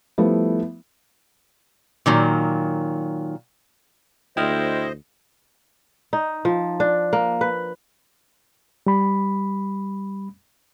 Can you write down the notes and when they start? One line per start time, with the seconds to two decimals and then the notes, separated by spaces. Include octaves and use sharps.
0.18 F3 G3 A3 B3 E4
2.06 A#2 D#3 F#3
4.37 D2 E4 C5 D#5 G5 D#6 F6
6.13 D#4
6.45 F3
6.80 D4
7.13 A#3
7.41 B4
8.86 G3 B5